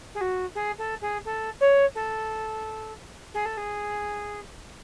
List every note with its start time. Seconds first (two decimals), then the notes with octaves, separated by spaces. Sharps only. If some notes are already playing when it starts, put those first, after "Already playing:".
0.15 G#4
0.21 F#4
0.55 G#4
0.78 A4
1.02 G#4
1.25 A4
1.61 C#5
1.95 A4
3.34 G#4
3.46 A4
3.57 G#4